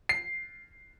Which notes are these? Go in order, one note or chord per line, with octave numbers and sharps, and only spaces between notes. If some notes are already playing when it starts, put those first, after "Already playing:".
C7